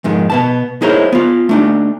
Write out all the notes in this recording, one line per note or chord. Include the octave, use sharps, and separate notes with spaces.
F2 G#2 D#3
B2 B3 A5
D#4 E4 G#4 A#4 C5 C#5
B3 F4
A3 D4 D#4